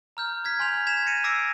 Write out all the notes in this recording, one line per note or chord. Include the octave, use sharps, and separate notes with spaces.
A#5 F6 G6
F6 G#6 B6
G#5 C6 G6 F7
G#6 B6 E7 F7
A#6 C#7 D#7
D6 E6 A#6 C7 D7